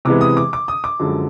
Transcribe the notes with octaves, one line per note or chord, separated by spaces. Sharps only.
C3 E3 G#3 B3 D6
D#6
D6
D6
D#6
D6
F#2 D3 F3 G#3